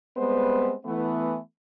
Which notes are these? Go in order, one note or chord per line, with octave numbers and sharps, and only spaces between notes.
G3 G#3 B3 C4 B4 C5
E3 A3 B3